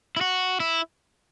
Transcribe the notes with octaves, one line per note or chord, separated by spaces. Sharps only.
E4
F#4
E4